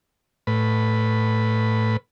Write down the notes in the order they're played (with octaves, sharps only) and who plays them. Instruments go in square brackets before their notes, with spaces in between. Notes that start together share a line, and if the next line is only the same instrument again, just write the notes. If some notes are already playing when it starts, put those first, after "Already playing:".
[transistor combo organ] A2 B4